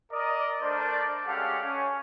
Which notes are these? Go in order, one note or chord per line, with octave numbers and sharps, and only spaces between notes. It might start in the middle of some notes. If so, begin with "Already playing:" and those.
A#4 D5 D#5
A3 D4 A#4 C5 D5
G#3 C#4 G4 A4 F5 F#5
C#4